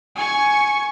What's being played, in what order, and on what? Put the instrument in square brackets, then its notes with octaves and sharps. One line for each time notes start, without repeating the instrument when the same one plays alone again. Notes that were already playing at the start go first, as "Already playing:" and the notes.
[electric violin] G#5 C#6